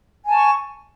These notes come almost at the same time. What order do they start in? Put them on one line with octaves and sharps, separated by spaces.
G#5 A5 C#6